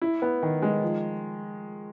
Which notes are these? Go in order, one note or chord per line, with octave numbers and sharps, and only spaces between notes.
E4
B3
D#3
G#3
F3